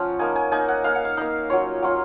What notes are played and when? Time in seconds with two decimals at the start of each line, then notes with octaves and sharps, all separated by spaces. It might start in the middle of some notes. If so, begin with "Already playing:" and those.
Already playing: F3 C#4 F#5 A#5
0.19 A#3 D#4 G#5
0.36 G#5
0.52 A#3 D#4 G#5
0.68 F#5
0.84 A#3 D#4 F5
0.95 F#5
1.05 F5
1.17 A#3 D#4
1.50 F#3 C#4 F4 C#5
1.82 F#3 C#4 F4